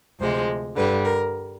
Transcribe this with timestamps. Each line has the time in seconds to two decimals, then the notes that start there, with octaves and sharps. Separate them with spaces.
0.19 D2 C3 F3 G#3 C5
0.76 G2 D3 G3 B4
1.05 A#4